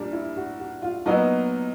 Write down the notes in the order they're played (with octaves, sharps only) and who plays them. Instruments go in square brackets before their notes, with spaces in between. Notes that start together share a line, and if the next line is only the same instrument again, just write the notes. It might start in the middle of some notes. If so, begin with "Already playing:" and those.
Already playing: [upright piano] A#2 F3 [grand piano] G3 D4
[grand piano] E4
F#4
F#4
F4
[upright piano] A#2 F#3 B3 D#4 [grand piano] F4